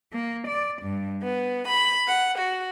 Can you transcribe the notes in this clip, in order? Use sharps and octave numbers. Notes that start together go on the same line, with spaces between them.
A#3
D5
G2
B3
B5
F#5
F#4